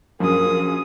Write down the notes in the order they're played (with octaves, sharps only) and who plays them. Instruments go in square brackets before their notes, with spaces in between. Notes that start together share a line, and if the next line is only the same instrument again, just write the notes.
[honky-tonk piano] A#1 F#2 [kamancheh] G#4 D#6 [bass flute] A#4